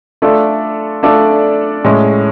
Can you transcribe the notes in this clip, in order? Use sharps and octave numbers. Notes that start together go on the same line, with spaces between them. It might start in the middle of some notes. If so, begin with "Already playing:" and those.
A3 D4 F4 A4 D5
A3 D4 F4 A4 D5
A2 G#3 C#4